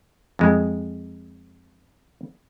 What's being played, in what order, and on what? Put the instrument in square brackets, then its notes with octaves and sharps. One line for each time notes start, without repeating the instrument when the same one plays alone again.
[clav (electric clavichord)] F2 G#3